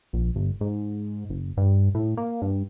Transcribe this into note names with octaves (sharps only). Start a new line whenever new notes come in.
A#1
G1
G#2
F#1
G2
A2
A#3
G2